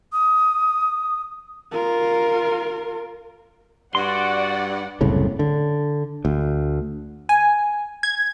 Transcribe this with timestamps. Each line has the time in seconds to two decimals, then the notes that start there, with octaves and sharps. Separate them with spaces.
0.13 D#6
1.72 F4 A#4
3.95 G2 F#4 D5 F#5 C6
5.01 F#1 C2 A2 C#3
5.39 D3
6.25 D2
7.29 G#5
8.03 G#6